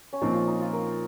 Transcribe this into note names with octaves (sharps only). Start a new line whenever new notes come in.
C#4
A#2 F3 C4 D#4
F4
D#4
F4
A#4